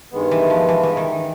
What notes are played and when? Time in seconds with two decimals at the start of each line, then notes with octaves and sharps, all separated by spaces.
0.12 G2 D#3 G#3 B3
0.31 E3
0.50 F3
0.69 E3
0.83 E3
0.97 D#3